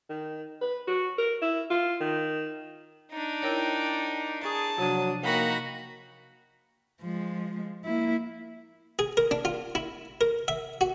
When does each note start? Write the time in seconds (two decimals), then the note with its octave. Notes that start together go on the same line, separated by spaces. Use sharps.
0.09 D#3
0.61 B4
0.87 F#4
1.18 A#4
1.42 E4
1.70 F4
2.00 D#3
3.11 D4 D#4
3.42 E4 A#4 C#5 G5
4.43 G#4 A5 A#5 C#6 D#6
4.78 C3 F3 F#3 D4 D#6
5.23 A#3 D#4 F#4 G5 B5 A#6
7.02 F3 G#3
7.85 A#3 E4
8.99 G#4
9.17 A#4
9.31 D4
9.45 F4
9.75 E4
10.21 A#4
10.48 E5
10.81 F#4